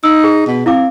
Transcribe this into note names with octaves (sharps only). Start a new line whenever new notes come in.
D#4 E6
G#4
B2
C4 E4 F5 D6